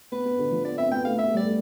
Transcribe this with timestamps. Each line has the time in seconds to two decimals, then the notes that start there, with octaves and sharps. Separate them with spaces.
0.12 B3 B4
0.25 B3
0.39 D3
0.51 F3
0.64 B3 D5
0.78 C4 E5
0.91 B3 G5
1.05 A3 F5
1.18 B3 E5
1.27 A3
1.34 G3 D5
1.44 A3